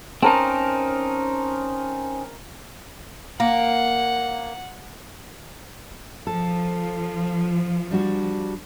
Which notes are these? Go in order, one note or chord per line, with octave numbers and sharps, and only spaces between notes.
C4 C#4 D#4 A#4 A5
A#3 F#5
F3 A4
G3 D4 F#4